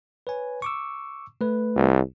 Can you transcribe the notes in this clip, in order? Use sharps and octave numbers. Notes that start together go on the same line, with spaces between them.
B4 C#5 G#5
C#6 D6 E6
A3 B4
C2